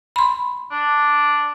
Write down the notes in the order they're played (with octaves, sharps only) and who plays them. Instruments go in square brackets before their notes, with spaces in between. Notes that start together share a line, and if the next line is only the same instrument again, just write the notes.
[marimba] B5 C6
[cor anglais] D4